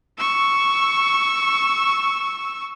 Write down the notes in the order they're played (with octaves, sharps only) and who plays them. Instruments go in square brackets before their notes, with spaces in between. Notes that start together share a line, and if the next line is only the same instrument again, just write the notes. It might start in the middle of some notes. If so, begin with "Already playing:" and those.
[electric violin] C#6 E6